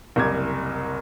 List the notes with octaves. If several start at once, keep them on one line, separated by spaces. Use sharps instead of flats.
F#1 C2 D6 G#6